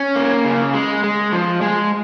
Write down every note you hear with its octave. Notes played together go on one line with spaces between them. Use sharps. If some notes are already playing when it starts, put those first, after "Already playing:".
Already playing: C#4
A#3
C#3
G#3
G#3
F3
G#3